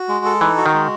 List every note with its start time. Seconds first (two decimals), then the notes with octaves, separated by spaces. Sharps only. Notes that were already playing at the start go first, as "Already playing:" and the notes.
Already playing: F#4
0.08 G#3
0.25 A4
0.41 E3 D#4
0.57 F#4
0.66 D#3
0.74 G#3